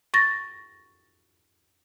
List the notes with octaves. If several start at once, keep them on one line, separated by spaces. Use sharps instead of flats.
C#6 A6 A#6